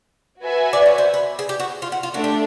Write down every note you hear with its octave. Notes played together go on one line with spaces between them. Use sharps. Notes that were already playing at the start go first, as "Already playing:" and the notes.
F#4 B4 E5 G#5
D5
C#5
C5
B4
G#4
G4
F#4
F4
F#4
F4
A3 D4 F#4
G4